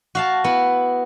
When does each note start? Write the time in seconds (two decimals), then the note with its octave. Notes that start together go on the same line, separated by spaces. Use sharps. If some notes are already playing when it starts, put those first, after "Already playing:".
0.15 F#4 F5 A5
0.44 B3 E4